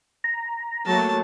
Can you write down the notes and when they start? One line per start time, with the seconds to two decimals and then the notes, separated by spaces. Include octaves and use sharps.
0.24 A#5
0.86 F#3 A3 A#3 A5